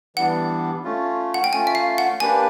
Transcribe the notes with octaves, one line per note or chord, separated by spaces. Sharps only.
E3 G3 B3 D4 F#5
A3 C#4 F4
F#5
G5
A3 C#4 F4 G#5
E5
F5
F#5
A#3 D4 G4 B4 G#5